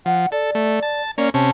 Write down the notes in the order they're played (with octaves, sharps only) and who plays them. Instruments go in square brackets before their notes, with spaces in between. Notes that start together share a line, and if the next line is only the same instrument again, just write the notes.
[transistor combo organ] F3 [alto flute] F#5
[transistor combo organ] A4 [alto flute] D5
[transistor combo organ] A3
A5
[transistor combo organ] A#3 C#4 [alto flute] D5
[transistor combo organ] C3 C#4 [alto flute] A5